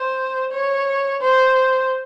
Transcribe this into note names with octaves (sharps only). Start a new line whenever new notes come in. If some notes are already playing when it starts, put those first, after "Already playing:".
Already playing: C5
C#5
C5